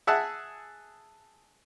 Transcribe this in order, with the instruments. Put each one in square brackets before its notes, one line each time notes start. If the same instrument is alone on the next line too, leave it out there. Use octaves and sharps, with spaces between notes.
[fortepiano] G#4 E5 F#5 A5